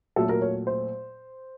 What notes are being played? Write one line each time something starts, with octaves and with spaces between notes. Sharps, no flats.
A#2 F#3 A3 A4
A#4
C#5
C5